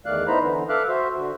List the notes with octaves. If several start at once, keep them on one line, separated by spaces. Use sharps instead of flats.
E2 D#3 A3 D5 F5 F#6
B3 D#4 E4 C5 A#5 B5
D3 E3 B3
A4 E5 F5 D6 F6 F#6
F#4 C5 E5
D3 F#4